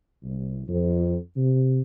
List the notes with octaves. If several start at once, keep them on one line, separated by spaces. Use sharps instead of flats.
C2
F2
C3